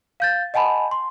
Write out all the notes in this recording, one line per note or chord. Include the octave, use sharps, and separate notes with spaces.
F5 G6 A6
D#5 F#5 G#5 A5 B5
C6